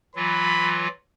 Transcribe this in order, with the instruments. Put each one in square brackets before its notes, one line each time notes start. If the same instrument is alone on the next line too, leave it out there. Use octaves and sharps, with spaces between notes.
[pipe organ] E3 F#3 F4 [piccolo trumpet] B5